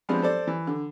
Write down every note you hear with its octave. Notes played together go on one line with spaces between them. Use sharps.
F3 G#3 B3 C4 D4
A4 C5 D5
E3
D3